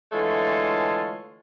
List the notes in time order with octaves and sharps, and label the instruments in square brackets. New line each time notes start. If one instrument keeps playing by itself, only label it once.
[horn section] D3 E3 G#3 A3 F4 C#5